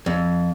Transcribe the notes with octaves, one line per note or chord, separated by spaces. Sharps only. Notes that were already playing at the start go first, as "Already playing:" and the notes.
F2